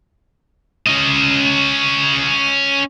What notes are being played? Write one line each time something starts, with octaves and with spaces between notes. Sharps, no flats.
C#4 D#5